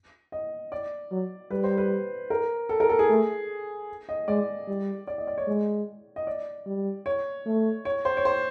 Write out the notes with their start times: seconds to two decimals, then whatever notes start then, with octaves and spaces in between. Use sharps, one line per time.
0.32 D#5
0.72 D5
1.11 F#3
1.51 G3 B4
1.64 C5
1.78 B4
2.30 A#4
2.69 A4
2.80 A#4
2.89 A4
2.99 G#4
3.10 A3
4.09 D#5
4.28 G#3 D5
4.68 G3
5.07 D5
5.18 D#5
5.27 D5
5.38 C#5
5.47 G#3
6.16 D#5
6.27 D5
6.66 G3
7.06 C#5
7.46 A3
7.85 C#5
8.05 C5
8.17 C#5
8.25 C5